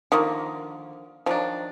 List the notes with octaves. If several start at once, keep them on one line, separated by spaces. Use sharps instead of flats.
D3 D#3 F3 A#3
D#3 F3 F#3 D4